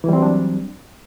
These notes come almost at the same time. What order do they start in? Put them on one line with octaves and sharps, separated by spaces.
E3 G3 C4 F#3 D4